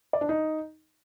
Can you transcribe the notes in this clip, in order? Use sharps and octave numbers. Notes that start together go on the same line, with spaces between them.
D5
D4
D#4